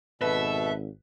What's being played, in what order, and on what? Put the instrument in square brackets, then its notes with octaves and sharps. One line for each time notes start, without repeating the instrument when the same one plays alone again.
[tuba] G#1 [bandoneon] B2 A4 [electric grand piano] B4 [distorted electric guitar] E5